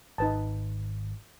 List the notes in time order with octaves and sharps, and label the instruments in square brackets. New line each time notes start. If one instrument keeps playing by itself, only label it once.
[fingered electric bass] G#1 [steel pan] D#4 B4 A5